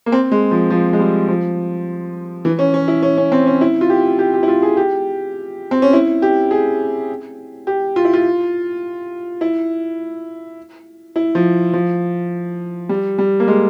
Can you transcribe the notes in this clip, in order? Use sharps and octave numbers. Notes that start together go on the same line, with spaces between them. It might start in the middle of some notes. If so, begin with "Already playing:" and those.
A#3
C4
G#3
F3
F3
G#3
G3
F3
E3
C#4
C#4
E4
C#4
C#4
C4
C#4
E4
F4
G4
G4
G4
E4
F4
G#4
G4
C4
C#4
E4
G4
G#4
G4
F4
E4
F4
E4
E4
F3
F3
G3
G3
A#3
G#3